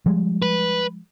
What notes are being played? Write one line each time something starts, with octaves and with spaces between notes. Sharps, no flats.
F3 G3 G#3
B4